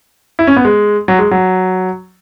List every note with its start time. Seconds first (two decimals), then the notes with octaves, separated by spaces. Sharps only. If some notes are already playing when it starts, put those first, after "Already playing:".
0.39 E4
0.47 C#4
0.56 B3
0.65 G#3
1.08 F#3
1.19 G#3
1.31 F#3